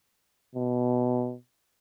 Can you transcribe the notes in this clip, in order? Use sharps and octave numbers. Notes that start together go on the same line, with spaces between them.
B2